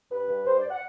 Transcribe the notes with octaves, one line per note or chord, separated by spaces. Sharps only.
G2 B4
G2
G2 C5
D5
F#5